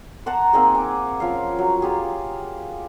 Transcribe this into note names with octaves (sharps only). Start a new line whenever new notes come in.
C5 F#5 A5 A#5
A#3 C4 D#4 G#4
G#5 D6
F3 C#4 F5
F#3
F4 G4 G#4